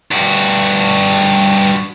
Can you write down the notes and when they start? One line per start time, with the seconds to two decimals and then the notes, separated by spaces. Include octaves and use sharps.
0.12 G2 F#4